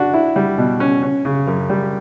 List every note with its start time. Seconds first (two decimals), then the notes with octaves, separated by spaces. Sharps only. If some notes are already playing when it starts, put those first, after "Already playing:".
Already playing: D4 F#4
0.14 E4
0.36 G3
0.58 B2
0.80 C#4
1.03 C#4
1.25 C#3
1.47 F#2
1.70 G3